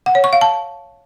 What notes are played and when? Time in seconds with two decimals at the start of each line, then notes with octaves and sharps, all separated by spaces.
0.06 F#5
0.15 C#5
0.24 C#6
0.33 F5
0.41 A5